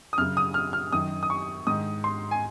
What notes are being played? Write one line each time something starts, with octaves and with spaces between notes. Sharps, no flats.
D#6
F#2 C#3 F6
D#6
F6
F6
F#2 D#3 D#6
D#6
C#6
G#2 D#3 D#6
C6
G#5